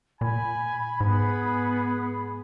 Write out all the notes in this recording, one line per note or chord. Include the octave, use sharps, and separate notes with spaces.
A#2 G#5 B5
G#2 B3 G#4